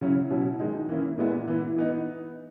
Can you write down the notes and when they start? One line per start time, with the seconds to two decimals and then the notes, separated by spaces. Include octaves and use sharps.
0.01 C#3 F#3 C#4 E4
0.30 B2 F#3 C#4 E4
0.59 D#3 G#3 D#4
0.89 E3 A#3 C#4 E4
1.18 A#2 G#3 B3 E4
1.48 E3 B3 E4
1.76 E3 B3 D#4